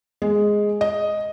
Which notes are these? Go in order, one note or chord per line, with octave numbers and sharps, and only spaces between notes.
G#3
D#5